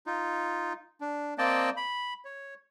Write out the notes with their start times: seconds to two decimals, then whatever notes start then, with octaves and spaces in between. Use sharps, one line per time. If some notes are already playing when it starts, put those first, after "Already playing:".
0.06 D#4 F4
1.01 D4
1.38 A#3 C4 D5 D#5 G5 A5
1.77 B5
2.25 C#5